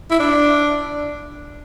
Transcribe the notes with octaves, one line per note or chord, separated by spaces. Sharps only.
E4
D4